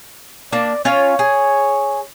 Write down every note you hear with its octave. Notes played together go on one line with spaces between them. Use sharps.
A#3 D4 D5
C#4 F4 C#5 F5
G#4